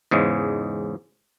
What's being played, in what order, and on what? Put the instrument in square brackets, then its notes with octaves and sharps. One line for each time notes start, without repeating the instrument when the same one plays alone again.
[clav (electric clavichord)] E2 G#2 C#3 G#3